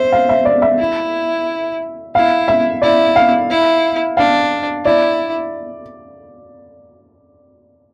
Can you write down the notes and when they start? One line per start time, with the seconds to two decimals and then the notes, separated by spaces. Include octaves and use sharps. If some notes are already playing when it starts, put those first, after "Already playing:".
Already playing: C5 E5
0.12 F5
0.29 E5
0.45 D5
0.62 E5
0.79 E4
2.15 E4 F5
2.48 E5
2.82 E4 D5
3.16 F5
3.50 E4
4.17 D4 F5
4.85 E4 D5